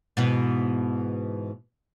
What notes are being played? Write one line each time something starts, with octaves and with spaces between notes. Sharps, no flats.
G#2 B2 E3